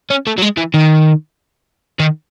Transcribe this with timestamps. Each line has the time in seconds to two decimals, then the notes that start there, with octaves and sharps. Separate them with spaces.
0.10 C#4
0.27 A3
0.38 F#3
0.42 G#3
0.57 E3
0.74 D#3
1.99 D#3